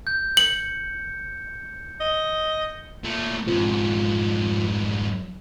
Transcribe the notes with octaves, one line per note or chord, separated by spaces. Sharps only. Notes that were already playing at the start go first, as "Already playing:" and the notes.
G6
C#7 F#7
D#5
A#2 A3
F2 G#2 F3